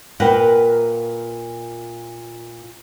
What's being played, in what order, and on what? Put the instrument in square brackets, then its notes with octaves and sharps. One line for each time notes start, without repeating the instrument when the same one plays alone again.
[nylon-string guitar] A#2 A#4 B4 F#5 G5